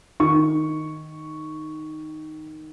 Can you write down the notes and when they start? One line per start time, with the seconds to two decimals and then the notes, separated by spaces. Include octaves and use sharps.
0.20 D#3 C#6